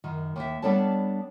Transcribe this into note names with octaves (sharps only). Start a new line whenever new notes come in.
F#2 D#3
D#2 E5
G3 B3 D4 A4 C#5 A5